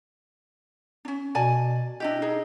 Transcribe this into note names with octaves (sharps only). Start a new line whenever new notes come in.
C#4 D4
B2 D5 G#5 A5
D4 E4 G4 D#5
D#4 G#4